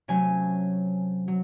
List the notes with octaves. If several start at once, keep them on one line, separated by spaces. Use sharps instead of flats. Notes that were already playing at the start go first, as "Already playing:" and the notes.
C3 F#3 A3 C#4 G#5
F#3